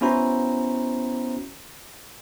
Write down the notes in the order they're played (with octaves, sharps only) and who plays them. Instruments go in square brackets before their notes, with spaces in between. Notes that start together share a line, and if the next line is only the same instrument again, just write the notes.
[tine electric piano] B3 C#4 E4 F#4 C5 A#5